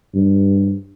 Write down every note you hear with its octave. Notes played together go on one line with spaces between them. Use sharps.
G2